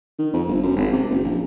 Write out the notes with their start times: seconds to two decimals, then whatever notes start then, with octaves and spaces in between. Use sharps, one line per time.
0.19 D#3
0.34 F2
0.47 G1
0.63 F#2
0.76 G#1
0.92 C3
1.10 F#1
1.24 A#1